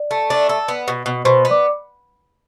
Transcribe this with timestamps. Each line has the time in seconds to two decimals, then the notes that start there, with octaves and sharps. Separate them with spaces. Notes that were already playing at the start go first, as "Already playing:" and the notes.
Already playing: D5
0.11 A3
0.30 D4
0.49 A4
0.68 B3
0.88 B2
1.06 B2
1.25 B2 C5 C6
1.45 B3
1.50 D5 D6